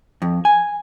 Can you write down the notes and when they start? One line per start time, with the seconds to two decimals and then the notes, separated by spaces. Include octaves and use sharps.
0.22 F2
0.45 G#5